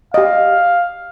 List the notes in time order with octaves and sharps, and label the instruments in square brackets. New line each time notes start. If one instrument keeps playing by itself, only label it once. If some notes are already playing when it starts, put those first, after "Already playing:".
[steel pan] G4 D#5 [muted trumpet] F5